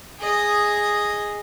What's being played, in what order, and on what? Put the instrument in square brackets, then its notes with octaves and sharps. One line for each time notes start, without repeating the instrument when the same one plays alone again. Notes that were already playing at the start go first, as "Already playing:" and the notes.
[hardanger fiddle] G#4 D#5